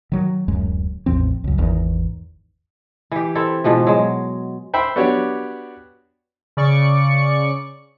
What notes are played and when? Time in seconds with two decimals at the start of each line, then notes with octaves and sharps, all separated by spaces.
0.12 D#3 F#3
0.48 D1 F#2 G#3
1.06 A1 E2 F3 C4
1.44 C#2 F#2
1.58 G#1 E2 D#3
3.11 E3 G4
3.35 C4 E4 A4
3.64 G#2 B2 E3 F3
3.87 F#3 G#3
4.74 C5 E5 G5 B5
4.96 B3 D4 F#4 G4 C#5
6.57 C#3 D5 C#6 C#7